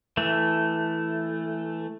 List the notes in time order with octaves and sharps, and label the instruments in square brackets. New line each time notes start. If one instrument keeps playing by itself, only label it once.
[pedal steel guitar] E3 A3